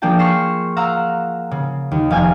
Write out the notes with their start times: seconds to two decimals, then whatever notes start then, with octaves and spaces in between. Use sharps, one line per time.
0.02 F3 A#3 D4 G#4 G5 A5
0.19 C6 C#6 F6 A#6 C7 E7
0.77 F5 F#5 A#5 E6
1.51 C#3
1.91 D#2
2.10 F1 F5 G#5 F6 G#6